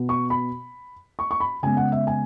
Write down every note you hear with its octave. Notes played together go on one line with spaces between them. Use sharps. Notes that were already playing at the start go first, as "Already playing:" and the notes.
Already playing: B2 B3
C#6
B5
C#6
C#6
B5
C#3 G#3 B3 G#5
F#5
E5
G#5